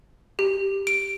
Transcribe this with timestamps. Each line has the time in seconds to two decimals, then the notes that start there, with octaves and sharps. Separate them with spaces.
0.39 G4
0.87 D7